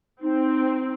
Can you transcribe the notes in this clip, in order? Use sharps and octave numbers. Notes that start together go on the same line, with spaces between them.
C4 D#4